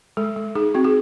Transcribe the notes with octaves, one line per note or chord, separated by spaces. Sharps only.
G#3 A4
G#3
D#4 G#4
C4 F#4
G#4